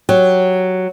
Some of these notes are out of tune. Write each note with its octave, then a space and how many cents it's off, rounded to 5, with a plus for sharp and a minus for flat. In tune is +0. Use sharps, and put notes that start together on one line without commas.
F#3 +0 G4 +0